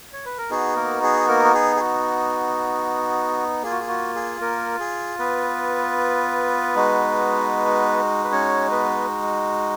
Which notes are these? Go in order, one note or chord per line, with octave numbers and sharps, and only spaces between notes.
C#5
B4
A#4
B3 D#4 F#4 G#4
A#3 A#4
G#4
A#3 A#4
F#4
G#4
G#4
F#4
A#3 F4 G#4
F#4
G#4
F#4
G#4
A#3 A#4
G#4
B3 B4
G#3 D#4 F#4
B4
C#4 C#5
B3 B4